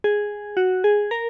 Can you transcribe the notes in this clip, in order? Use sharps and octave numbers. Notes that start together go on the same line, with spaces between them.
G#4
F#4
G#4
A#4